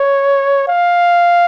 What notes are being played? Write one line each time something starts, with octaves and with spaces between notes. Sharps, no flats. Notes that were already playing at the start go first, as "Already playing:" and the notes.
Already playing: C#5
F5